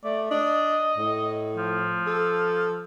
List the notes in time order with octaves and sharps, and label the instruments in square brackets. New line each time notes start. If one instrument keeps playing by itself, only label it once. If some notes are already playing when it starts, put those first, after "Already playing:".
[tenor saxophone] A3 [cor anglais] D5
[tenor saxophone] D4 [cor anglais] D#5
[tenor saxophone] A2
[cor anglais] F3
[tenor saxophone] A4